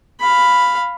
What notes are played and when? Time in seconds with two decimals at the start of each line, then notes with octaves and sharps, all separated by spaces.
0.20 F5 B5